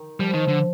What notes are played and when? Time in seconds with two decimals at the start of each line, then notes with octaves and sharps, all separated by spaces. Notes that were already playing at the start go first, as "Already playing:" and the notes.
Already playing: D#3
0.19 F3 G3
0.34 D#3
0.48 D3